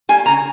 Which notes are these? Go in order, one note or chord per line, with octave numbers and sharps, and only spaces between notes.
G3 A#3 G#5
C#3 A#5